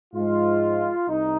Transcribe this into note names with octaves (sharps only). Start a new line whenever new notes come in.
G#2 F3 G#3 F4
C2 D#4